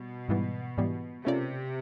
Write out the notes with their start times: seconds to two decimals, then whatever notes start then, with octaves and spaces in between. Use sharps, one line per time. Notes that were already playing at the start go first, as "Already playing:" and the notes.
Already playing: B2 G3
0.29 G#2 E3 G3 B3
0.77 G#2 E3 G3 B3
1.25 C3 A3 C#4 F4 A#4 D5